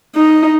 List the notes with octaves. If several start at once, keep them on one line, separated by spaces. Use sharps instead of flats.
D#4